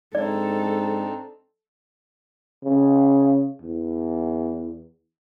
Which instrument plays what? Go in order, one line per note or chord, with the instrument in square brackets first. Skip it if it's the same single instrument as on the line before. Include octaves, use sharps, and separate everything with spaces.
[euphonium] G#2 [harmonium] C4 D4 D#4 [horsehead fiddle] A4 [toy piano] D5
[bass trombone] C#3
E2